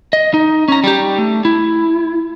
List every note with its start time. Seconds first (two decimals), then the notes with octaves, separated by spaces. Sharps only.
0.13 D#5
0.34 D#4
0.68 C#4 A#5
0.84 G3 G4
1.18 A3
1.45 E4